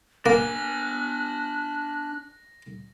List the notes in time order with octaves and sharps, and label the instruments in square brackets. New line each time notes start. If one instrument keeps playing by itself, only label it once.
[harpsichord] A#3 [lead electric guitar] D4 G#5 [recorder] F#6 [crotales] A#6